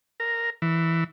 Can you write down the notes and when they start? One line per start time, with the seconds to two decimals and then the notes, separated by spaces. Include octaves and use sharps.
0.20 A#4
0.62 E3